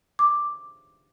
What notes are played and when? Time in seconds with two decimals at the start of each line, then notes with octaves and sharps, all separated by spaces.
0.19 D6